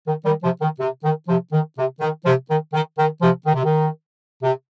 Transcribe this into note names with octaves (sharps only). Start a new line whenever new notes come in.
D#3
D#3 G3
C3 F3
D#3
C3
D#3
C3 F3
D#3
C3
D#3
C3 F3
D#3
D#3
D#3
C3 F3
D#3
C3
D#3
C3